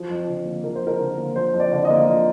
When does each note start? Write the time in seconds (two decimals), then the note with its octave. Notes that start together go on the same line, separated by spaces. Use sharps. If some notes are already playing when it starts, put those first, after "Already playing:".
Already playing: F3
0.09 F2
0.27 D3
0.45 A#3
0.64 F3 A#4
0.75 C5
0.81 F2
0.87 A#4
1.00 D3
1.18 A#3
1.36 F3 C5
1.54 F2
1.60 D5
1.72 D3
1.85 D#5
1.90 A#3
2.08 F3